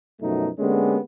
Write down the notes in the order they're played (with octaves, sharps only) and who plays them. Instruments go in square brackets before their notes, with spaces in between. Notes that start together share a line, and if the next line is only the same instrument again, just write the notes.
[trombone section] F#2 B2 F3 F#3 A3 D#4
D3 G#3 A#3 B3 C#4 G4